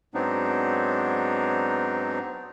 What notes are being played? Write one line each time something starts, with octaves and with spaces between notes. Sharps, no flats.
G#2 F#3 B3 C4 D4 D#4